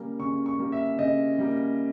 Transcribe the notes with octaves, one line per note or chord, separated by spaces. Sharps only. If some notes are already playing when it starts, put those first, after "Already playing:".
Already playing: C#3 G3 A#3
C#3 C#6
C#6
G3 A#3
E5
C#3 D#5
G3 A#3